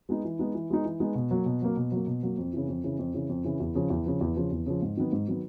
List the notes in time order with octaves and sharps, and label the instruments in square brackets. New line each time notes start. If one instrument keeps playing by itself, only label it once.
[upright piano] G#3 B3 D#4
E3
G#3 B3 D#4
E3
G#3 B3 D#4
E3
G#3 B3 D#4
B2
F#3 A#3
B2
F#3 A#3
B2
F#3 A#3
B2
F#3 A#3
F2
C#3 E3
F2
C#3 E3
F2
C#3 E3
F2
C#3 E3
E2
C#3 F3
E2
C#3 F3
E2
C#3 F3
E2
C#3 F3
G#2
D#3 F#3 B3
G#2
D#3 F#3 B3